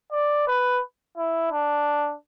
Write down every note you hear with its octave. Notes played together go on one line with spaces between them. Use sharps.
D5
B4
E4
D4